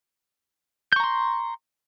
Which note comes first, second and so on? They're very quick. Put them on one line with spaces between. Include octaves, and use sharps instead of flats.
G6 C#6 A#5 C6